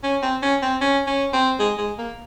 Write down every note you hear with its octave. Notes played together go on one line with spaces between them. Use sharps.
C#4
C4
C#4
C4
C#4
C#4
C4
G#3
G#3
A#3